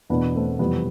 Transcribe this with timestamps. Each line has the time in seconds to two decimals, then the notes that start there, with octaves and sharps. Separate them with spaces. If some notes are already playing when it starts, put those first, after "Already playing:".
0.10 E2 B2 B3 D4
0.35 A3 C4
0.59 F2 C3 E3 G3 B3